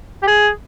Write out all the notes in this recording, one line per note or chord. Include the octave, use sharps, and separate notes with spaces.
G4
G#4